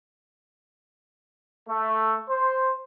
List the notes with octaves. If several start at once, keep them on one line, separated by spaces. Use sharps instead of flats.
A3
C5